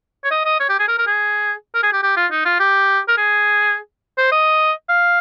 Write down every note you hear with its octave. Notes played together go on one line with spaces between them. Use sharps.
C#5
D#5
D#5
C#5
G4
G#4
A#4
A#4
G#4
A#4
G#4
G4
G4
F4
D#4
F4
G4
A#4
G#4
C5
D#5
F5